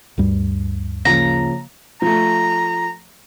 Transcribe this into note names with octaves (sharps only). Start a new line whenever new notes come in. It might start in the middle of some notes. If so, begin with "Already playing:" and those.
D2 G2 G3
C#3 F3 A#3 A#5
F3 A3 A#5